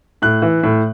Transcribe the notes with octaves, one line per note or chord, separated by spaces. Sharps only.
A2 F#6
E3
A2